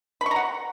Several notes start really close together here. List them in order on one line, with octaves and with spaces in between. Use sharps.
B5 C#6 A#5 F#5